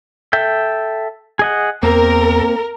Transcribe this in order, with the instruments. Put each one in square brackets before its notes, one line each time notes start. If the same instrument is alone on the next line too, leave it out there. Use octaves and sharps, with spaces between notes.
[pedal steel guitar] A4 E5 G5
G#4 D#5 F#5
[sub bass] E2 [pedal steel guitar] A#3 C4 [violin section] A#4